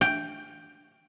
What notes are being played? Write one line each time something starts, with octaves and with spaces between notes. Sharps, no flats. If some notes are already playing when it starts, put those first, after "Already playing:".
G5